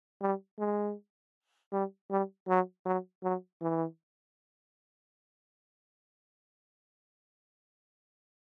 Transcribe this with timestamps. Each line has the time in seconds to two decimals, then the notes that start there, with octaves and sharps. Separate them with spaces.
0.21 G3
0.59 G#3
1.72 G3
2.10 G3
2.48 F#3
2.85 F#3
3.23 F#3
3.61 E3